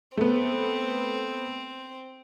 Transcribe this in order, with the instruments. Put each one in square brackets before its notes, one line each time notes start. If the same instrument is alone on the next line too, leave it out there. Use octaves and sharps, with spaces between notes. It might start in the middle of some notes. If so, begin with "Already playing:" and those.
[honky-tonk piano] A3 B3 [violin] C4